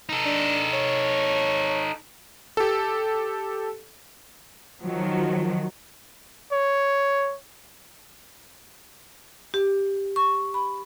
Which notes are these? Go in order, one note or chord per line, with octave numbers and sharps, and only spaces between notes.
D#4 A4
D4
C#5
G4 A4
D#3 F3 F#3
C#5
G4
C#6
B5